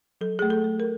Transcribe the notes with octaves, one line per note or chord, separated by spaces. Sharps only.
F#3 A4
A3 G#4
A4
A3
A#4